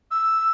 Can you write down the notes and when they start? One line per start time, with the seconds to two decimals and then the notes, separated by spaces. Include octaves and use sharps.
0.11 E6